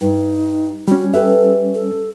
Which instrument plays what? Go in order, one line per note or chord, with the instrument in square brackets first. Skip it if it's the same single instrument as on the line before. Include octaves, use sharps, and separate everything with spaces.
[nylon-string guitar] G2 [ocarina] D#4
[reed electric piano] G3 C#4 [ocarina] F#4
[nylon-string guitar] G4 B4 E5 [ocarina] A4
[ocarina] A4